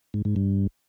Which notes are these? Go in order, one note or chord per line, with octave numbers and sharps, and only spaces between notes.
G#2
G#2
G2